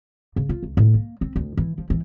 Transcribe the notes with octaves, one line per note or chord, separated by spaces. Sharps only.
C#3
F4
C#2
A2
A#3
C4
D2
E3
F3
E3